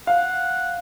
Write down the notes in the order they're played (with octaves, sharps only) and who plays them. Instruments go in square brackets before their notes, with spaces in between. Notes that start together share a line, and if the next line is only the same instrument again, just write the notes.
[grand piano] F5 [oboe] F#5